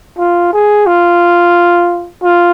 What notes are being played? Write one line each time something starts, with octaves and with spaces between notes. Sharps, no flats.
F4
G#4
F4
F4